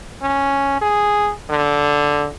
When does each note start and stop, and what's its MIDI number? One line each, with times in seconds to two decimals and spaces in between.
0.22 0.79 61
0.81 1.32 68
1.50 2.28 50